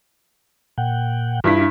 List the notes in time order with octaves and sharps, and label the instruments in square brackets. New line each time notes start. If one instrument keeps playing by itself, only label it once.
[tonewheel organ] A#2 F#5 G5
[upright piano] G2 E4 B6 [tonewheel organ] D4 F4